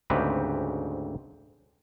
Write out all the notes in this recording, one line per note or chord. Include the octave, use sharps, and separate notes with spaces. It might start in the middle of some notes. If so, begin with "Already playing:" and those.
D2 G#2 C#3 C4 G4 B4